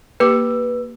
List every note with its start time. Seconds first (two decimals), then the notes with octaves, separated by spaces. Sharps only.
0.20 A#3 G4 B4 D6